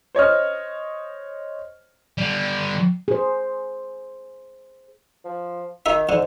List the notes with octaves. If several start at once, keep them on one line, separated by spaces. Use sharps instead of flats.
C5 C#5 D#5 F6
D3 G3
G#4 C5
F3
D#3 D#4 E5
G#2 D3